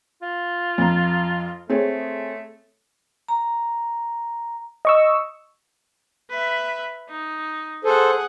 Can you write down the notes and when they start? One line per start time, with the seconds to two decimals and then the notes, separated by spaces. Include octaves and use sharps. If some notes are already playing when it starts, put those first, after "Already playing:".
0.22 F4
0.78 F2 A#5
1.70 A3 C4 G#4 C#5
3.28 A#5
4.85 D#5 C#6 E6
6.30 B4 E5
7.09 D#4
7.85 G#4 A4 C5 F#5